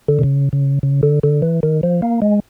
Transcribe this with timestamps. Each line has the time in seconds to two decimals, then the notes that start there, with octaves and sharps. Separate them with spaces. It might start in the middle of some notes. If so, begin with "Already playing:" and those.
0.08 D3
0.19 C3
0.23 C#3
0.53 C#3
0.83 C#3
1.03 D3
1.23 D3
1.42 E3
1.63 D#3
1.83 F3
2.02 A#3
2.22 G#3